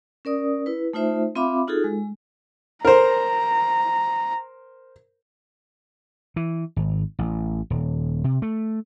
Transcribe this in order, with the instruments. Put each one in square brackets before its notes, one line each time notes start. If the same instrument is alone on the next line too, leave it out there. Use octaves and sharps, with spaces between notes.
[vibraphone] C#4 A#4 D5 D#6
E4 B4
A3 D#4 F4 C5 E5
C4 F4 E5 F5 B5 D6
D#4 F4 F#4 G#4 A4
G#3
[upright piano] A#4 C5 [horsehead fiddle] A#5
[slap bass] E3
G#1
A1
D#1
C3
A3